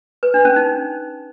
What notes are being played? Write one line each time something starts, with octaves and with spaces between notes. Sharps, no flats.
B4
D4
C#4
D#4